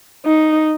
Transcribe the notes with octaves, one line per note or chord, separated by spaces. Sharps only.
D#4